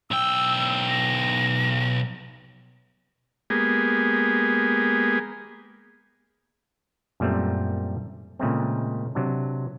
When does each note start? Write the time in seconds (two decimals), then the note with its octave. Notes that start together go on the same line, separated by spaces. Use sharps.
0.11 B1 G5 E6
0.89 A#6
3.50 G#3 A#3 B3 G4 G#4
7.20 F#2 A#2 G3 A3 C4
8.39 A#2 C#3 G#3 A3 C4
9.15 C3 F#3 D4